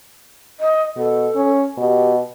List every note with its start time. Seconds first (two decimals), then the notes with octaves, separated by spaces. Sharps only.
0.60 D#5
0.97 B2 A4
1.35 C#4
1.78 B2 G4